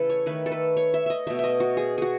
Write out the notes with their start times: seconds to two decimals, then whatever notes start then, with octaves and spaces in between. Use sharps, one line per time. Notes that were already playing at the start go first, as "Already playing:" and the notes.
Already playing: C#3 E3 A3 A4 B4
0.10 C#5
0.26 D#3 A3 B4
0.46 A4
0.52 B4
0.77 C#5
0.94 E5
1.06 D#5 E5
1.27 B2 A3 E5
1.39 D#5 E5
1.60 F#4
1.77 G#4
1.98 F#4 G#4